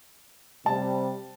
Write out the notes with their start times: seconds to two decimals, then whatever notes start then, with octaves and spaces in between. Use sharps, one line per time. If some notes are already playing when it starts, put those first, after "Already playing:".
0.66 C3 G3 A5